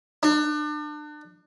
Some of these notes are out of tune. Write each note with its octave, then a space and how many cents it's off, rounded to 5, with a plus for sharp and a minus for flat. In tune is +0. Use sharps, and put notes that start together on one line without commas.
D4 +35